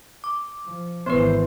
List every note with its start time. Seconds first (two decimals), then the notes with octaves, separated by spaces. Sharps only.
0.24 D6
0.66 F3
1.06 G#1 E3 B3 B4 C5